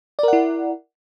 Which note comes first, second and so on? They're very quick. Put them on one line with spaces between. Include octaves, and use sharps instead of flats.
D5 A#4 F#5 E4